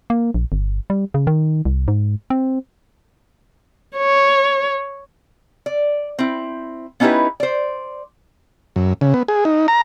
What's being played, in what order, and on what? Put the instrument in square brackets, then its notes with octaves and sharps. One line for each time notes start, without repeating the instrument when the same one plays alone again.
[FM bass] A#3
A#1
G1
G3
C#3
D#3
C2
G#2
C4
[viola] C#5
[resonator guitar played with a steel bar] D5
C4 E4
B3 C#4 D#4 E4 G4 B4
C5 D5
[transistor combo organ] F#2
C#3
B3
G#4
D#4
A#5